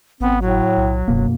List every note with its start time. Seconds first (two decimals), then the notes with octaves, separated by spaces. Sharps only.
0.21 G#1 B3 C4
0.42 A2 F#3
0.77 B1
1.08 D#1 F#2 B2 A#3